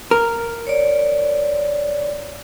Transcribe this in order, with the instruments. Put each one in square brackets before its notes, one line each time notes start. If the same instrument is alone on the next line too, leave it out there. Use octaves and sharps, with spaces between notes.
[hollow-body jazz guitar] A#4
[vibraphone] C#5 D5